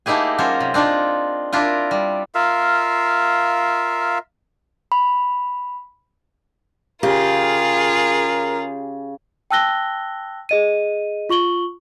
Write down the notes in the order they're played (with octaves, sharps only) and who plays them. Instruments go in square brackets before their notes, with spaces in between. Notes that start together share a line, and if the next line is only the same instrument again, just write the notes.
[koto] A3 A#3 D#4 E4 G4 G#4
F#3 C#4 F4 A#4 C5
C3
C4 D4 D#4 F4
D4 E4 F4 A#4
G3
[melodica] F4 A#4 E5 F5
[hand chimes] B5
[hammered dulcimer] C#3 [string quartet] F4 G#4 [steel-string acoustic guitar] G4 [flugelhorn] A#4
[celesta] G5 A5 E6 F#6 A#6 G7
G#4 D#5 D#7
F4 C#6 F#7 G7